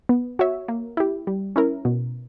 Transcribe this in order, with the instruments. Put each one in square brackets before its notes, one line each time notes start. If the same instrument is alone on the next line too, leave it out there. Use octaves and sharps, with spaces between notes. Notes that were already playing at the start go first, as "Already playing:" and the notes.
[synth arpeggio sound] B3
F#4 C#5 E5
A#3
E4 G4
G3
C#4 E4 A#4
B2